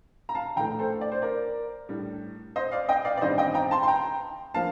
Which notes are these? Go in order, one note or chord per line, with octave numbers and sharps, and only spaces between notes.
A#5
F5 A5
A#1 A2 A3 G5 A#5
A4 C5
D5
C5
A#4 D5
A2 G3 D4
C5 D#5
D5 F5
D#5 G5
D5 F5
D5
A1 G2 D#3 G3 C4 C5 D#5
D#5 G5
G5 A#5
A5 C6
C6
G5 A#5
F3 A#3 D4 F5 A5